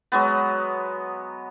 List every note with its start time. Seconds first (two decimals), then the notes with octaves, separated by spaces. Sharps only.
0.12 F#3 G#3 B3